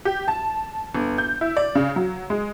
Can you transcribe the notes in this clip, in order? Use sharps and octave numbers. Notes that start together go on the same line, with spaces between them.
G4
A5
G1
G6
E4
D5
C#3
F#3
G#3